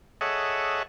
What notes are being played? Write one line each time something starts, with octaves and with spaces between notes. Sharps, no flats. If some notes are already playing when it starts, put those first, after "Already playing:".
G#4 A4 C#5 D#5 E5 F#5